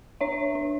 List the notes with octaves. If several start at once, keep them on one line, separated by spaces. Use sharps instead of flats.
D4 C#5 E5
D4